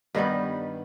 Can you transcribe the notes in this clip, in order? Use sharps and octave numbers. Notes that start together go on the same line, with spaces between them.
G2 D#3 G3 B3